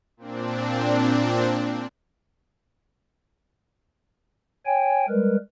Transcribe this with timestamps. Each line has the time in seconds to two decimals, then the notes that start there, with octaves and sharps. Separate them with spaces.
0.17 A#2 C4 D4
4.66 C#5 G5 G#5
5.09 G3 G#3 A#4 B4